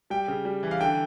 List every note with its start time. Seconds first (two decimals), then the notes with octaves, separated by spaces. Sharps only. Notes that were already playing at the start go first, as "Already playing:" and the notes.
0.10 G3 G5
0.28 C#3
0.45 G3
0.63 E3
0.71 F5
0.80 D3 G5